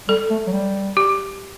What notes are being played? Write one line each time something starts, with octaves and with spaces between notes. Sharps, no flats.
G3 A4
A3
F#3
G3
G4